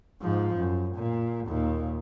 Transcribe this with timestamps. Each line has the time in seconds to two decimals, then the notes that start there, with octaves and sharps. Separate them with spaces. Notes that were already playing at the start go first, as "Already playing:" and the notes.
0.22 G#2 F3
0.56 F#2
0.96 A#2
1.47 D#2 A#2